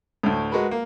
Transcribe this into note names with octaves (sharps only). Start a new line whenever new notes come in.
D2 A2
G#3 F#4 A#4 B4
A#3